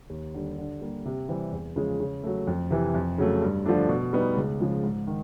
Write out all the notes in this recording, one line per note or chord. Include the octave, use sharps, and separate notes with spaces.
D#2
D3 G3
D3
G3 A#3
C3
E3 G3 C4
E2
C#3 F3 G#3
C#3
F#3 A3
F2
C3 E3
F2
C#3 F#3 A3
G2
D3 F3 A3 D4
B2
G3 B3 D#4
C#2
C#3 F3 G#3
G#2
D#3